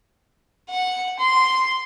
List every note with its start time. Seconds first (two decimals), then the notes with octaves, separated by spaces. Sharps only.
0.70 F#5
1.19 C6